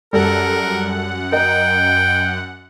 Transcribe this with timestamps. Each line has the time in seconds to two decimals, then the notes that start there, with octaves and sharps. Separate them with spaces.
0.13 F#2 G3 A4 A#4 F#5
1.32 A#4 D#5 G5